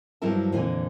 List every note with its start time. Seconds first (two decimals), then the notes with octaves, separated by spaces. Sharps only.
0.22 G2 F3 F#3 E4 A#4 A5
0.52 F2 A#2 D3 E3 A#4 G#5